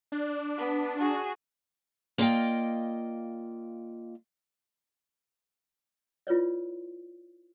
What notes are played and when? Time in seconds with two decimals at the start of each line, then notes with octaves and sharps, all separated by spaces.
0.12 D4
0.58 B3
0.99 F#4 G#4
2.18 A#3 F4 D5 D#5 F5 G5
6.27 E4 F4 B4 C#5 D5